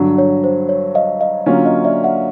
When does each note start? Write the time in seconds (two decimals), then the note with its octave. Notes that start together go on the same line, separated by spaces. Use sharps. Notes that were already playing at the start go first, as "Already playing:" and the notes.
Already playing: G2 D3 F#3
0.18 C#5
0.44 C5
0.69 C#5
0.95 D#5 F5
1.21 D#5 F5
1.46 D3 F#3 A#3 C#4 F4
1.65 C#5 D#5
1.85 D5 E5
2.04 E5 F#5